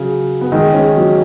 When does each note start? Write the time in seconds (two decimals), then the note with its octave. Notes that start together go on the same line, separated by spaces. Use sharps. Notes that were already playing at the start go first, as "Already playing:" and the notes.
Already playing: C#3 F#3
0.41 B3
0.52 D#3 G#3
0.74 G#3 C#4
0.96 F#3 B3